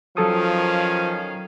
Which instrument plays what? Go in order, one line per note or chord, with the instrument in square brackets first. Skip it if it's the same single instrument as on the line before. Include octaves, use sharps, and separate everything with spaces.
[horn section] D#3 C#4 F5 [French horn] F3 [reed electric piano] F#3 A4 D#6